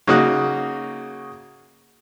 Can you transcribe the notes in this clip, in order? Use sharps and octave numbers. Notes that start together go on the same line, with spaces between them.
C#3 A#3 D#4 F#4 D#6 F#6